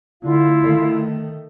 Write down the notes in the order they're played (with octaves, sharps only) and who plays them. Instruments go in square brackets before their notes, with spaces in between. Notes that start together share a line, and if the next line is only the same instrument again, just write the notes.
[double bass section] D3 A3 [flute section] E4 F4 F5
[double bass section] D#3 A3